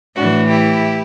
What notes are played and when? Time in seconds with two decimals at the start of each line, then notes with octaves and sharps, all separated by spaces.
0.15 A2 E3 D4 F#4
0.49 E4 G4